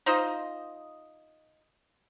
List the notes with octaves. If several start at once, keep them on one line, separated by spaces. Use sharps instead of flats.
D#4 F4 C5 D#5